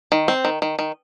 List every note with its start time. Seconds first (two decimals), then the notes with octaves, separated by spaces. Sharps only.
0.12 D#3
0.28 C4
0.45 D#3
0.62 D#3
0.79 D#3